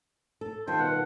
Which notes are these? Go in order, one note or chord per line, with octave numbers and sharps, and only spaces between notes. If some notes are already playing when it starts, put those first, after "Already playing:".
A4
D#3 G3 F4 A4 C5
B2 F#5